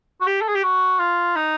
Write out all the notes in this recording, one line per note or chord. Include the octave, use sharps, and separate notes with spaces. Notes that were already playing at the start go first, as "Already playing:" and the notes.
F#4
G4
A4
G#4
G4
F#4
F4
D#4